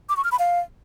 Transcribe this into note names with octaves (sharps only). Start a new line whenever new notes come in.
D6
C#6
F6
B5
F5